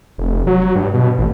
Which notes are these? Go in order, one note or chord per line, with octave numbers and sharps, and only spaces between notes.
F1
F#3
G2
B2
A1